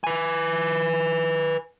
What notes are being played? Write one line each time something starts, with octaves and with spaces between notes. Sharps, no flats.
B4 G#5